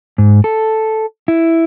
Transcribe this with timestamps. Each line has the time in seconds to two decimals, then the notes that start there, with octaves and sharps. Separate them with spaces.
0.18 G#2
0.44 A4
1.28 E4